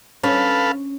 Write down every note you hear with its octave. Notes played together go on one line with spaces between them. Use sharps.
C#4 A4 B4 F5